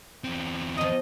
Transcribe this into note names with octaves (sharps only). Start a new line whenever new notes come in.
E2 C4
F3 D#5 A#5